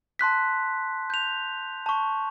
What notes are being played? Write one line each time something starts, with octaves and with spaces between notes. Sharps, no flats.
A5 C6 F#6 B6
G6 F7
A5 C#6